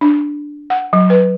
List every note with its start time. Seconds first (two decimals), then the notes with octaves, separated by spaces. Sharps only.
0.01 D4
0.70 F#5
0.93 F#3
1.10 B4